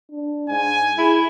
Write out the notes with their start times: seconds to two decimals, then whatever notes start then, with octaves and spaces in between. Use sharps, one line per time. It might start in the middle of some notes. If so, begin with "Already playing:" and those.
0.11 D4
0.49 G#2 G#5
0.98 E4 G#4